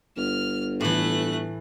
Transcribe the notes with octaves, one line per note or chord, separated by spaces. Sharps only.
G1 F6
A2 E3 A3 F#6